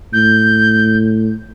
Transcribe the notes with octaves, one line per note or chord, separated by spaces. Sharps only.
A2 G6